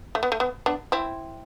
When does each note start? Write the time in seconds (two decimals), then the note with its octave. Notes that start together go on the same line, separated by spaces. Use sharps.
0.15 A3
0.23 B3
0.32 A3
0.40 B3
0.66 B3 D4
0.92 C4 E4